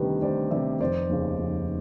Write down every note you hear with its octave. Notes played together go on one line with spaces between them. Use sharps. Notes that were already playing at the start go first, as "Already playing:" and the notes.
Already playing: D2 C3 D#3 G3 B3 A4 B4
D2 C5 D5
C3 D#3 G3 B3 D5 E5
F1 C5 D5
D#2 C#3
F1